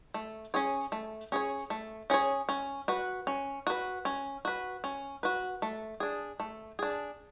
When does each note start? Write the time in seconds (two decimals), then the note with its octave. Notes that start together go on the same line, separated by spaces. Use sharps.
0.14 A3
0.54 C#4 G#4 C#5
0.92 A3
1.32 C#4 G#4 C#5
1.70 A3
2.10 C#4 G#4 C#5
2.49 C#4
2.88 F#4 B4
3.27 C#4
3.67 F#4 B4
4.05 C#4
4.45 F#4 B4
4.84 C#4
5.23 F#4 B4
5.62 A3
6.00 D4 G#4
6.40 A3
6.79 D4 G#4